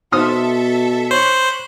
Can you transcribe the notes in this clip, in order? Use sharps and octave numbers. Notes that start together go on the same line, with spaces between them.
B2 A4 C5 E5 D#6 F6
C5 C#5 B5 C#6 F#6